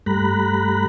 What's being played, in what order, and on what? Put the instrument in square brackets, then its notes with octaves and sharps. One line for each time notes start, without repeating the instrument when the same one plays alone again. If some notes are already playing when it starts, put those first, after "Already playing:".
[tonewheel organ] G2 G3 A3 A#5 B5 F#6